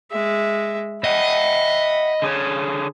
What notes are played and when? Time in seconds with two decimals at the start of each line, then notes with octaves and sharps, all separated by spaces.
0.11 G#3 E5
1.04 D#5 E5 F#5 G5 B5
2.22 D3 G#4 C#5